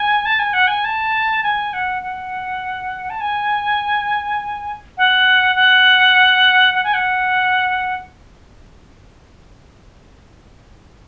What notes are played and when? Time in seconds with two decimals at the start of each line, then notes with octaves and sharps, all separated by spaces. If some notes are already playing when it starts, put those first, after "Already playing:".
Already playing: G#5
0.26 A5
0.39 G#5
0.53 F#5
0.67 G#5
0.85 A5
1.43 G#5
1.73 F#5
2.02 F#5
3.10 A5
3.21 G#5
4.98 F#5
5.56 F#5
6.74 F#5
6.84 G#5
6.94 F#5